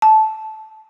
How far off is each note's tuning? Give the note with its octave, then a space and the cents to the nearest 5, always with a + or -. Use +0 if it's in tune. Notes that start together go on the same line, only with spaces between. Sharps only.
A5 -15